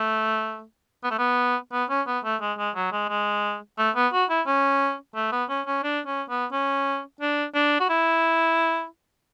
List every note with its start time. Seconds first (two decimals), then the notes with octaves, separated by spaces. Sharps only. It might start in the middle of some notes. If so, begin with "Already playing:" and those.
Already playing: A3
1.04 B3
1.11 A3
1.19 B3
1.73 B3
1.90 C#4
2.07 B3
2.24 A3
2.41 G#3
2.58 G#3
2.76 F#3
2.92 G#3
3.09 G#3
3.78 A3
3.96 B3
4.13 F#4
4.30 E4
4.47 C#4
5.15 A3
5.32 B3
5.49 C#4
5.67 C#4
5.84 D4
6.06 C#4
6.29 B3
6.52 C#4
7.21 D4
7.55 D4
7.80 F#4
7.89 E4